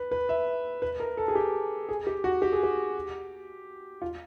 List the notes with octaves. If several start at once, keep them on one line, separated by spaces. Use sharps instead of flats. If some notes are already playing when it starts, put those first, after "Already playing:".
Already playing: B4
B4
E5
B4
A#4
A4
G#4
G4
G#4
G4
F#4
G4
G#4
G4
F4